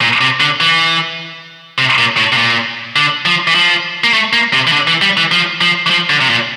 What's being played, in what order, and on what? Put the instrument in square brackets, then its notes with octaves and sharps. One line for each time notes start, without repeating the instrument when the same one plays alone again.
[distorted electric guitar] A#2
C3
D3
E3
C3
A#2
A2
C3
A#2
D3
F3
E3
F3
A#3
A3
A#3
C3
E3
D3
E3
G3
E3
F3
F3
E3
F3
D3
C3
A#2